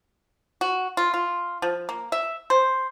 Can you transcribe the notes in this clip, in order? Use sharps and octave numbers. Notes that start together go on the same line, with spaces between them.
F#4
F4
F4
F3
A#3
E5
C5